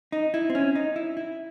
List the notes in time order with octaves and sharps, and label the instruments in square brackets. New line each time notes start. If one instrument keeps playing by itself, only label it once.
[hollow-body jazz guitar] D#4
E4
C4
C#4
D#4
E4
E4